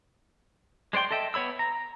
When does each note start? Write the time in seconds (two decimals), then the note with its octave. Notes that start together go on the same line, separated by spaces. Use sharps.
0.93 G#3 C5 D5 G5 C6
1.11 A4 D#5 E5 G5
1.34 B3 C#5 B5 E6
1.59 A#5